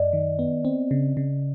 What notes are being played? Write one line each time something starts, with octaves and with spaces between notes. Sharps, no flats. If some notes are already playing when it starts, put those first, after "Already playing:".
Already playing: F#2 D5 D#5
D#3
B3
C4
C#3
C#3